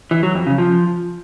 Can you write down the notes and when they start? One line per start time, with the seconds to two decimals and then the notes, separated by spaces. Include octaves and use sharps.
0.11 E3
0.23 F#3
0.35 F2
0.47 C#3
0.58 F3